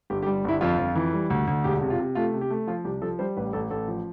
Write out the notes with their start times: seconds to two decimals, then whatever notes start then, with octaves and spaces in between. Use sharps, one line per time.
0.10 G1 G4
0.23 G4
0.26 G3
0.44 G1 E4
0.61 F2 F4
0.78 F2
0.95 E3
1.13 G3
1.30 D2
1.47 D2
1.64 E1 G4
1.82 C3
1.90 F4
1.99 C3
2.15 A3 F4
2.33 C3
2.41 G4
2.50 A3
2.67 F3 F4
2.85 C2 G4
3.02 F3 A4
3.19 G3 C5
3.37 A1 B4
3.53 A1 A4
3.70 A1 A4
3.88 F3